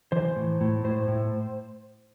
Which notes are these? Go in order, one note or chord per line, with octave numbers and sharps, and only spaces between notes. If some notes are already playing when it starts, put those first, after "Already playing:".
E3 C5
A2
A2
A2 C5
A2